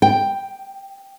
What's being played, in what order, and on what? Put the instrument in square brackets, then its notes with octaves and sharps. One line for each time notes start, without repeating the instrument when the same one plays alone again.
[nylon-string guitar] G5